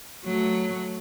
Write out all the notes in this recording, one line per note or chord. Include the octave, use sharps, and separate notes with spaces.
F#3 A3